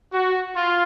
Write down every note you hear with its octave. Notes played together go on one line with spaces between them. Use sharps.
F#4
F4